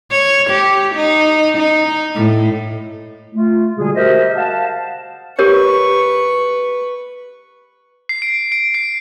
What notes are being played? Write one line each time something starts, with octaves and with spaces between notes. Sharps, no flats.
C#5
G4
D#4
D#4
A2
A3 F4
B2 D3 G3 G#3 G#4
F#4 G4 A#4 C5 D#5 E5
F5 F#5 A5
G4 A#4 B4 C#5 C#6
C7
D7
D7
C7